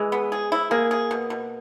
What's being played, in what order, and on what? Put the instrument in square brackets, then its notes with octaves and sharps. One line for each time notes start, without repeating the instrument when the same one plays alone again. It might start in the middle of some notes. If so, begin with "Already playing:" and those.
Already playing: [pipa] E3 [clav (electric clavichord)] G#3
[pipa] B3
G#4
E4
[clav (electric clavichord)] A#3 [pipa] G#4
[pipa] G#4
B2
B2